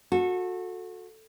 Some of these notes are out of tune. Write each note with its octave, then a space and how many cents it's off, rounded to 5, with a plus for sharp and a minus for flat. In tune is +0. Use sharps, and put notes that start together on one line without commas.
F#4 -25 A4 +0